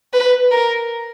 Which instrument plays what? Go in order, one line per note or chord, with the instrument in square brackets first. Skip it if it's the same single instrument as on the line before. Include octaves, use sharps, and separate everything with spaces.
[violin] B4
A#4